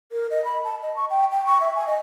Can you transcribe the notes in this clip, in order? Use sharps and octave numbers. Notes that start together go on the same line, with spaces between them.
A#4
D#5
B5
A5
D#5
C#6
G5
G5
C#6
E5
G#5
D#5